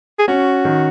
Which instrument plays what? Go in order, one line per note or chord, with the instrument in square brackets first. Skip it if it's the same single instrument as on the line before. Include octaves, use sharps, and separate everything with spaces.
[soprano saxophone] G#4
[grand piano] C#4 [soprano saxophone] F#4
[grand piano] D#3